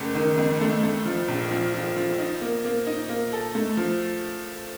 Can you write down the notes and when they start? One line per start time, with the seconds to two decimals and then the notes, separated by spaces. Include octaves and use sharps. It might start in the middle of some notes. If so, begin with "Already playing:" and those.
Already playing: F#1 A3
0.15 D#3
0.37 F2
0.61 A3
0.83 A3
1.05 F3
1.28 A#1
1.51 F3
1.74 F3
1.96 F3
2.19 D#4
2.41 A#3
2.65 A#3
2.87 D#4
3.09 A#3
3.33 A4
3.55 A3
3.77 F3